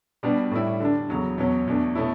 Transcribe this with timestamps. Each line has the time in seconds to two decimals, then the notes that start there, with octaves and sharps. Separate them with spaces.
0.23 B2 G3 B3 D4
0.51 A2 G3 C#4 E4
0.80 D3 G3 D4
1.09 E2 C#3 F#3 C#4
1.38 E2 B2 F#3 C#4
1.67 E2 B2 A3 D4
1.95 B2 A3 C#4 E4